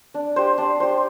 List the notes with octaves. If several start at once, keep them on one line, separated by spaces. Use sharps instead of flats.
D4
G4 C5
D4
G4 C5